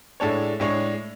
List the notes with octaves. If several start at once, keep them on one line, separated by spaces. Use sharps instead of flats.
A2 G#3 D4 A4 C#5
A2 G#3 D4 G#4 C#5